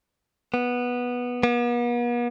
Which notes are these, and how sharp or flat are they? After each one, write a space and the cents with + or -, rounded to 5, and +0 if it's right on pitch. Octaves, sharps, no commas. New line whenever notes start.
B3 -10
B3 -45